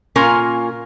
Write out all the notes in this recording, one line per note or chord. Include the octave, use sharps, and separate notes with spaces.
A#2 C#4 F4 A#4 G#5